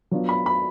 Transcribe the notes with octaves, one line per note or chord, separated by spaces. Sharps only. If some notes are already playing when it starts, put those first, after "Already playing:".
F#3 B3 D4 F4
B5
B5